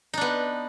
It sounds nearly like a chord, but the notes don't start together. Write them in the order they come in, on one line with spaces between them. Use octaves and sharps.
D#4 D4 B3